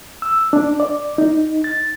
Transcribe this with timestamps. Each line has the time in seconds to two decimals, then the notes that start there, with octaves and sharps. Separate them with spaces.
0.22 E6
0.53 D4
0.80 D5
1.18 D#4
1.64 A6